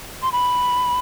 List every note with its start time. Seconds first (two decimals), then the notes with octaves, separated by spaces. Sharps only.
0.23 C6
0.32 B5